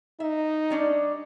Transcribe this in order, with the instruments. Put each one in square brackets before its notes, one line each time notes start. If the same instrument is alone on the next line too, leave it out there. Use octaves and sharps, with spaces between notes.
[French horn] D#4 [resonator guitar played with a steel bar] E5
[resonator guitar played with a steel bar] G3 C#4 D4